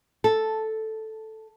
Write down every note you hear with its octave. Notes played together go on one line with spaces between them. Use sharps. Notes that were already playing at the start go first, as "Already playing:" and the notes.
A4